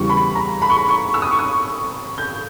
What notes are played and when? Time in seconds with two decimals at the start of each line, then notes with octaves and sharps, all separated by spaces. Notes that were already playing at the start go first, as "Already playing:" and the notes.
Already playing: E2 C#3 G3 C#6
0.10 B5
0.35 A#5
0.62 B5
0.70 C#6
0.77 B5
0.88 C#6
1.14 E6
1.22 D#6
1.31 C#6
1.39 D#6
2.18 G6